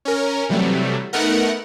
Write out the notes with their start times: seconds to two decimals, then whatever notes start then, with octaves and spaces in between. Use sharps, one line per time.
0.05 C#4 A#4
0.49 C3 E3 F#3 G3 A3
1.13 A3 B3 D#4 A#4 F#5